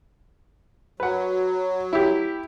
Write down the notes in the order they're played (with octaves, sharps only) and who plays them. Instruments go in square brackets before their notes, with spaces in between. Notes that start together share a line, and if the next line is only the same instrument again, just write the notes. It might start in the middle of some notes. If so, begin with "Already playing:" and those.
[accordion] F#3 [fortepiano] B4 F#5
[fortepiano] E4 G4